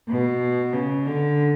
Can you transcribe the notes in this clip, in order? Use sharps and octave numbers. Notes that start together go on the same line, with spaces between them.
B2
C#3
D3